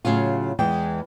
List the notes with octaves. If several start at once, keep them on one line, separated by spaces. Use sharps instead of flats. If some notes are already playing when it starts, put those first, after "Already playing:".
A2 C#3 F#3 F4
E2 E3 G#3 G5